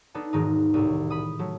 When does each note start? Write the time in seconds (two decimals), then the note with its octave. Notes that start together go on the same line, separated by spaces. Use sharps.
0.15 B3 D4 D#4 A4
0.33 E1 G#2 D#3 D#4
0.74 C2 A2
1.10 B5 D#6
1.39 F#3 A3